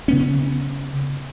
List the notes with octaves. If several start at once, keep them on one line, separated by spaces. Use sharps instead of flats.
C#3 B3 C#4